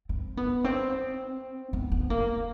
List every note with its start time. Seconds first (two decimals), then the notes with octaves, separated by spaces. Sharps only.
0.09 C4
0.37 B3
0.64 C4
1.73 B3
1.92 B3
2.10 A#3